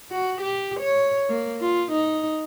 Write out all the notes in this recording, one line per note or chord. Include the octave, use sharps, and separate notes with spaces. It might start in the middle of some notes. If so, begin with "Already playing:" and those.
F#4
G4
C#5
A#3
F4
D#4